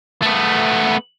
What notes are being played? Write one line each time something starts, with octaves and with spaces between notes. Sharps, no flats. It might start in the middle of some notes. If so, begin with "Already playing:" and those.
A3 B3